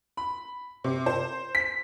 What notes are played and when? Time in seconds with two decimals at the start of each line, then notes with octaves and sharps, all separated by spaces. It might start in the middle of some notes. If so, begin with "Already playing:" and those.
0.17 B5
0.84 C3
1.06 C5
1.55 B6